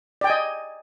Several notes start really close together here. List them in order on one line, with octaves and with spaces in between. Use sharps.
D5 G5 G#5 D#5